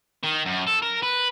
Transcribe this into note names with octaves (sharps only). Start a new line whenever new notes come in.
D#3
F#2
A4
A#4
B4